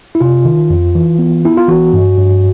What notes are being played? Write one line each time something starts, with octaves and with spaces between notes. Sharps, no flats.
E4
C3 F4
D#3
F2
E3
B3
B3 E4
F4
E3 F#4
G2
G2